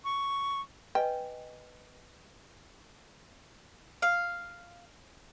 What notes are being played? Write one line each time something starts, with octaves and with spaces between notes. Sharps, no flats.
C#6
B4 D#5 G5 G#5
F5